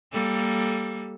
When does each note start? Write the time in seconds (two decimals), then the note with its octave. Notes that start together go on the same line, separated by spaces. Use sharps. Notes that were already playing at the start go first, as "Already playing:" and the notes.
0.13 G3 A#3 A4